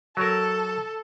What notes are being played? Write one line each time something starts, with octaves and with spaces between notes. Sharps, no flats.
F#3 A4 A#4